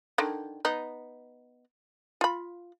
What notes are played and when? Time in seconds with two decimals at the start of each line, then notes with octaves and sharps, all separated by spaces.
0.18 D3 D#3
0.65 B3 D#4
2.21 F4 B5